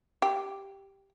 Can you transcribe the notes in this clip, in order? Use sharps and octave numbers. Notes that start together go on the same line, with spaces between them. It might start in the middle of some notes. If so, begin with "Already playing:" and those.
G4